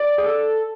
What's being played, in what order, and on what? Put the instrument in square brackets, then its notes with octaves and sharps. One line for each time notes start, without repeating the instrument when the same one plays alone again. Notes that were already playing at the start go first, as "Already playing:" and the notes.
Already playing: [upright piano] D5
[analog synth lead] G#4
A4